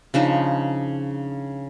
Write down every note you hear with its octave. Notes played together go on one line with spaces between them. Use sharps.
C#3 F3 D4 D#4